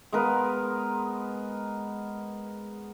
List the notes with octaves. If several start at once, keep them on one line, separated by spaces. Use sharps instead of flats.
G#3 B3 A#4 B4